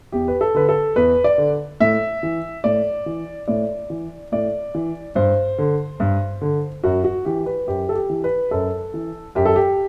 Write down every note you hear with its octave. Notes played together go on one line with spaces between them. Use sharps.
E2 G4
B4
A4
D3 B4
A4
E2 B4
D5
D3
A2 E5
E3
A2 D5
E3
A2 D5
E3
A2 D5
E3
G2 C5
D3
G2
D3
F#2 F#4
F#4
E3 G4
B4
F#2 G4
A4
G4
E3
B4
F#2 A4
E3
F#2 G4
A4
G4